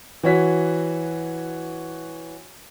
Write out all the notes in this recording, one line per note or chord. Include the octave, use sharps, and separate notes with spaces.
E3 F#4 C#5 B6